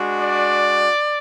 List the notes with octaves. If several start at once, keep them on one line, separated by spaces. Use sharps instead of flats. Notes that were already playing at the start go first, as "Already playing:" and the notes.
Already playing: G#3 D4 F#4
D5